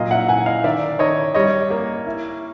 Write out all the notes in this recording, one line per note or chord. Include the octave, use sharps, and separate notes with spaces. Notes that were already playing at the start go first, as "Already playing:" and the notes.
Already playing: A#2 F#3 D#5 F5
E5 F#5
A#2 F#5 G#5
D#5 F5
D#3 D5 E5
D#3 C#5 D#5
G3 C#5 D#5
A#3
E4